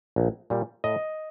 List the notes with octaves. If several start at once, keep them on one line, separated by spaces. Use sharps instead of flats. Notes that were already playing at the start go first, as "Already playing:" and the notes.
A#1
A#2 G3
A2 D#5